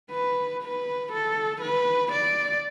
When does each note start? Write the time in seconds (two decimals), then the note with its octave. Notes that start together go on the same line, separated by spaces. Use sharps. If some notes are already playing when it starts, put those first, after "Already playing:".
0.11 B4
0.63 B4
1.12 A4
1.61 B4
2.12 D5